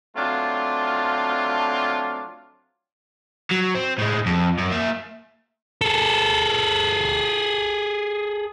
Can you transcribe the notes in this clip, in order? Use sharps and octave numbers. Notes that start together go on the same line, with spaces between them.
F#3 A3 C4 D4 F4
F#3
C4
A2 G#3
F2
F#2
A#3 E5
G#4 A4